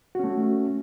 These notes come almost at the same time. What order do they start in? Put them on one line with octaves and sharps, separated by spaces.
F#4 C#4 A3